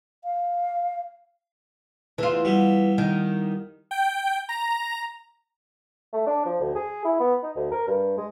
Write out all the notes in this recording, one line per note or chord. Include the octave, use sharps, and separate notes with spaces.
F5
E2 E3 F4
G3 B3 E4
D#3
G5
A#5
A3
D4
F3
D2
G#4
E4
B3
D#4
D2
A#4
G2
G#3